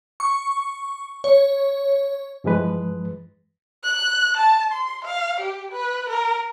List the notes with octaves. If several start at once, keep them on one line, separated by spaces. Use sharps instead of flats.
C#6
C#5
G2 E3 F3 G#3 B4
F#6
A5
C6
F5
G4
B4
A#4